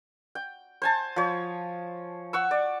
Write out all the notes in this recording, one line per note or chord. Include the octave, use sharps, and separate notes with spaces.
G5
C5 G#5 A5
F3 C#5
F#5 C#6 E6
D5